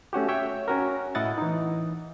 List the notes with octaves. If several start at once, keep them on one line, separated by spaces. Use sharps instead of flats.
A3 C#4 F#4 G4
C#5 E5 G5
C#4 F#4 A#4
A2 E4 D#5 F#5 A6
E3 D#4